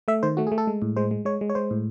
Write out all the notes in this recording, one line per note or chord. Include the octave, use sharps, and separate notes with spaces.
A3 E5
D#3 C5
A3 F#4
G#4
A3
A4
G#3
A2
G#3 C5
G#3
G#3 C#5
G#3
C#5
G#3 C5
A2